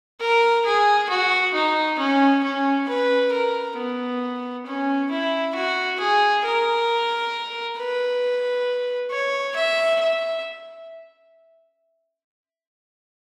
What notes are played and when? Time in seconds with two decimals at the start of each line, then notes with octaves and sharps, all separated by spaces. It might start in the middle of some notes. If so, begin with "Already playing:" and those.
0.21 A#4
0.65 G#4
1.10 F#4
1.54 D#4
1.99 C#4
2.44 C#4
2.89 B4
3.33 A#4
3.77 B3
4.67 C#4
5.11 E4
5.55 F#4
6.00 G#4
6.45 A#4
7.78 B4
9.11 C#5
9.56 E5
10.01 E5